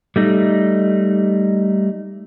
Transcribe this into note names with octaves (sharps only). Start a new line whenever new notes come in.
G3 A3 D#4